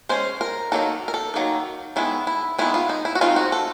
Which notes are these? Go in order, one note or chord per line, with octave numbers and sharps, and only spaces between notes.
G#3 C#4 C5
A#4
D#3 F#3 A#3 D#4 A4
A#4
A4
D#3 F#3 A#3 D#4
D#3 G#3 B3 E4
E4
D#3 G#3 B3 E4
F4
D#4
E4
F#4
D#3 G#3 C4 D#4 F4
F#4
A4